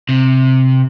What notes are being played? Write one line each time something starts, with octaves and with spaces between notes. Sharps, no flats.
C3